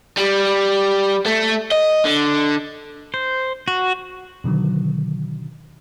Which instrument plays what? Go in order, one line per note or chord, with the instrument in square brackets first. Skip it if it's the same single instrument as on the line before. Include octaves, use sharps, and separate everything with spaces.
[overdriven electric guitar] G3
A3
D#5
D3
[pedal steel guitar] C5
F#4
[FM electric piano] B2 D3 D#3 F#3